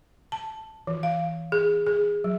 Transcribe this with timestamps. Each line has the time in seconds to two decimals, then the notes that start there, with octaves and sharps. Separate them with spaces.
0.32 A5
0.87 E3
1.03 F5
1.52 G#4
1.86 G#4
2.24 F#3